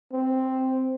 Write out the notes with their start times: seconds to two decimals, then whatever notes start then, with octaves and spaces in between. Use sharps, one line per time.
0.12 C4